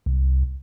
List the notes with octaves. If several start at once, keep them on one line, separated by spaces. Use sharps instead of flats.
C2